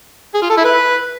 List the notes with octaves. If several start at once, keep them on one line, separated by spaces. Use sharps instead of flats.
G#4
F4
A4
E4
B4